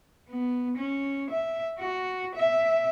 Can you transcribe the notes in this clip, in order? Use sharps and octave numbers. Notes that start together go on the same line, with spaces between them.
B3
C#4
E5
F#4
E5